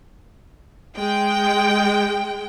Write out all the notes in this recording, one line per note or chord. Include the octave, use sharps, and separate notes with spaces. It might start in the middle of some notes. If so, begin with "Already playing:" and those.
G#3 G5